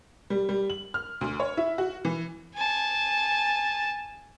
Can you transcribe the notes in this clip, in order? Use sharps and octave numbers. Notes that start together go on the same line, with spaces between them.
G3
G3
F#7
F6
D2
C#5
E4
F#4
E3
G#5 A5